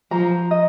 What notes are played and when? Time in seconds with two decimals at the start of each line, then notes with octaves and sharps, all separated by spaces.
0.11 F3 A#5
0.51 D#5